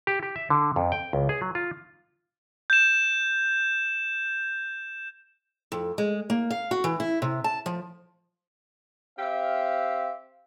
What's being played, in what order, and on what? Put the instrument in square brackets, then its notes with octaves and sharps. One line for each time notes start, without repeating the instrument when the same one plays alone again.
[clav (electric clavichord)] G4
G4
E5
D3
F2
G5
C#2
G#4
F#3
F4
[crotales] G6 E7
[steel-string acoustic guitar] F2
G#3
A#3
F5
F#4
E3
E4
C3
A5
F3
[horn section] C4 G4 E5 F5